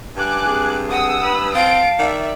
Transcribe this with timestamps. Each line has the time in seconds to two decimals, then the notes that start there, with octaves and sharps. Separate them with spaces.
0.16 G2 G#5 D6 F#6
0.45 C4 G#4
0.91 F#5 D#6 E6
1.22 B4 B5
1.55 C4 F5 A5 D7
1.99 D#3 D5 E5